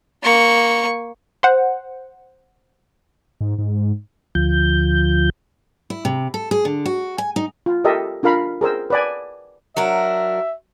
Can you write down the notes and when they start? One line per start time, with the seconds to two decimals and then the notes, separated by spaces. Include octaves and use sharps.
0.23 A#3 C#6
1.43 C5 F#5
3.41 G#2
3.59 G#2
4.35 D2 F3 G6
5.90 E4
6.05 C3
6.34 A4
6.51 G#4
6.65 D3
6.86 F#4
7.18 G#5
7.36 D#4
7.66 F4
7.84 G4 A4 A#4 D#5 E5
8.23 D4 F4 A#4 F5 B5
8.61 G#4 A#4 C5 E6
8.90 B4 D5 G#5
9.77 F#3 D4 A#4 E5